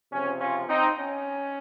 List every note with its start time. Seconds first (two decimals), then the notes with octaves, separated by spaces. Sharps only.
0.11 C#2 C3 F3 C4 C#4
0.40 C#4 F4
0.68 C4 D#4
0.97 C#4